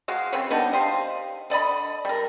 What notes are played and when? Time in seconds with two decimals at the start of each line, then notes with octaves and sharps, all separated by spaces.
0.08 G#3 F#4 F5
0.33 C#3 C4 B4 C#5
0.51 G3 B3 D4 D#4
0.73 G4 C5 D#5 F5
1.50 D3 D5 D#5 B5
2.05 G3 A#4